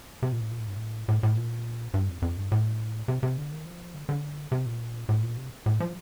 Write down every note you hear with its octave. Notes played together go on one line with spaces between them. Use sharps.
C3
A#2
A2
A#2
A2
G2
A2
A2
A2
A#2
G2
F2
F2
G2
A2
C3
C3
D3
D#3
F3
D3
D3
C3
A#2
A2
A#2
C3
A2
F3